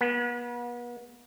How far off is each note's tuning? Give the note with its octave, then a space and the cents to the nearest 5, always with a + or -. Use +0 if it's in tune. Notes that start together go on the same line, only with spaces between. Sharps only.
B3 -40